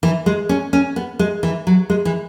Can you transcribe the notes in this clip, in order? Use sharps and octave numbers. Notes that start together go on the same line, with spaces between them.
E3
G#3
C#4
C#4
B3
G#3
E3
F#3
G#3
E3